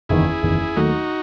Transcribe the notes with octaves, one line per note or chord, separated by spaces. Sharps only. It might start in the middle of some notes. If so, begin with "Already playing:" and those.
F#1 E2 D#3 E4 G#4
F#1 E2 D#3
D#2 D#3 F#3 A3 D#4 F#4